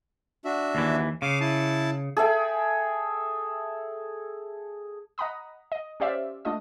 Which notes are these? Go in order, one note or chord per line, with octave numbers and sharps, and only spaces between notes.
D4 F#4 E5
D#2 E3
C#3 F5 D6
E4 A5
G#4 A4 E5 G5
D#5 F#5 A#5 B5 D#6
D#5
C#4 G4 C5 D5 E5 F5
A3 D4 F4 D#5 D#6